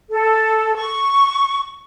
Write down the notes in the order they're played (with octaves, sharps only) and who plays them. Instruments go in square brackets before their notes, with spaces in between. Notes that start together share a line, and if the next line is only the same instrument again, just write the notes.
[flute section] A4
C#6